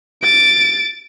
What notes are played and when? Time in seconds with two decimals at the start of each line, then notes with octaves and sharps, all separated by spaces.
0.22 A6 D7